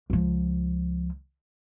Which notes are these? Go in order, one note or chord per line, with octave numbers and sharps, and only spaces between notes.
C#2 F3